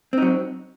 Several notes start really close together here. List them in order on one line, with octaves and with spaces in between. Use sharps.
C4 D#4 F#3